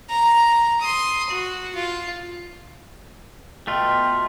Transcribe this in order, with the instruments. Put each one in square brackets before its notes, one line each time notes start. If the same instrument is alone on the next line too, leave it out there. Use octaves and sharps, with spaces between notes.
[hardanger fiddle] A#5
C6 D#6
F#4
F4
[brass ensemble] B2 D#5 G5 [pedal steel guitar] A3 F4